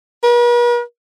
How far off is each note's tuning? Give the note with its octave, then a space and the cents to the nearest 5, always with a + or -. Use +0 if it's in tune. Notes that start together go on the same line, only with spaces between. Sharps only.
B4 -45